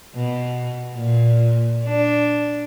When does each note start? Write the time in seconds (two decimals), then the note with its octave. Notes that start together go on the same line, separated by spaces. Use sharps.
0.15 B2
0.95 A#2
1.85 D4